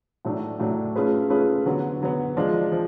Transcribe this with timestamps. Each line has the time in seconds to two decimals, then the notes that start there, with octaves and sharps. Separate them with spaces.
0.25 A2 F#3 A3 D4
0.60 A2 F#3 A3 D4
0.95 A3 C#4 F4 G#4 B4
1.30 A3 C#4 F4 G#4 B4
1.65 D3 F#3 B3
2.00 D3 F#3 B3
2.36 F3 G#3 D4 F4
2.72 F3